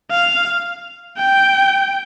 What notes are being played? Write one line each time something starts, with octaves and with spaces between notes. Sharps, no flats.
F5
G5